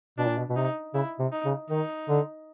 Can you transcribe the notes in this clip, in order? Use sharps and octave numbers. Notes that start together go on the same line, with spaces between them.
B2 D4
A#2
B2
B2
C3 D#4
C#3 E4
C3
D#4
C#3
D#3 D#4
D3